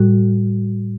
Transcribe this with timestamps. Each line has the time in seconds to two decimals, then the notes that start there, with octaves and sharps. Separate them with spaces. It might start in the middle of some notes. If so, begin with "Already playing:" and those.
Already playing: A2 G3 F#4